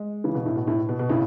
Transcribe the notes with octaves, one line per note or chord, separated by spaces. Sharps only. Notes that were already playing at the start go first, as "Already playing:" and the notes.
Already playing: G#3
C#3 E3
B2
A2
B2
A2
B2
B2
A2 C#3